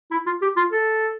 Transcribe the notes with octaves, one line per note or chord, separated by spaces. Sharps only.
E4
F4
G4
F4
A4